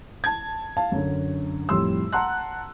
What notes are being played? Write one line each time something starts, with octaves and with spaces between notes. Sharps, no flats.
A5 G#6
F5 A5
F#2 D3
F2 A2 G3 C6 E6
F#5 A5 A#5 C6 F#6